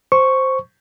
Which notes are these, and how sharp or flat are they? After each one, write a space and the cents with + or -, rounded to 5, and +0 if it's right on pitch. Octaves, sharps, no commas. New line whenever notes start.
C5 +0 C#6 +0